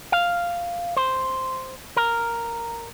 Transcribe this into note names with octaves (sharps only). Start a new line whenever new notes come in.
F5
C5
A#4